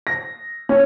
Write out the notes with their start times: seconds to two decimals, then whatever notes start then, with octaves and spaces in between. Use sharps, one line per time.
0.07 A#6
0.69 C#4